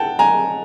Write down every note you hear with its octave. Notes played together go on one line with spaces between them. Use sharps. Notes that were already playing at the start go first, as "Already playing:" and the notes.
Already playing: F#5 G5 A5
G#5 A#5